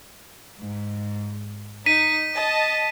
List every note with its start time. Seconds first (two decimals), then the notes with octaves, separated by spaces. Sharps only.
0.59 G#2
1.86 D#4 B6 D#7
2.33 D#5 A5